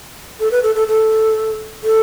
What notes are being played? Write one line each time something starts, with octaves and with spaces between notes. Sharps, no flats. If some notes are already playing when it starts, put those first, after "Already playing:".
A4
B4
A4
A4
A4
A4